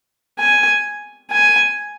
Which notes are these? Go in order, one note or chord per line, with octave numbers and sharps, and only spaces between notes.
G#5
G#5